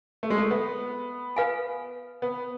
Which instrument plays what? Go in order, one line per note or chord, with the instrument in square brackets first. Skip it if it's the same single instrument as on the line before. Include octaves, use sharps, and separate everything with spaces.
[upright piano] A3
G#3
A3
B3
[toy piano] B4 F5 G#5
[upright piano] B3